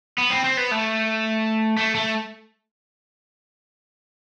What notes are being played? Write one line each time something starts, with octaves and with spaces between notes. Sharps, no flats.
B3
C4
C4
B3
A3
A3
A3